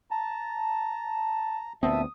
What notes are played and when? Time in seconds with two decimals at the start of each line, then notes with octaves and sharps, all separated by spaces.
0.11 A5 A#5
1.83 D2 A#2 B3 C4 E5 A5 D#6